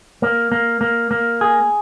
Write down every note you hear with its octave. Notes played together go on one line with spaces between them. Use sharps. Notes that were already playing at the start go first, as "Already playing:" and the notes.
A#3
A#3
A#3
A#3
G#4